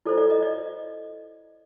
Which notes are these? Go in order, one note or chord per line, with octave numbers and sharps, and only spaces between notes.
E4 A4 C5 D5
D5
D#5
D5